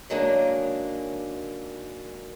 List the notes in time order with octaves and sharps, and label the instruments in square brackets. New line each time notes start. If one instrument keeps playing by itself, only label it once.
[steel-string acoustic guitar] D#3 F#3 G#3 A#3 D4